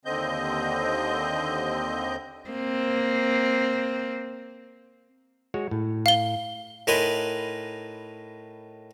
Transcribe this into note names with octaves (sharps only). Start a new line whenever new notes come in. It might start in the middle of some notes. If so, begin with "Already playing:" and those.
D#2 D3 C4 D#5 G6
A#3 C4
G#3 F#4 C#5
A2
F5 G7
A2 D#4 A#4 B4 G#5 C6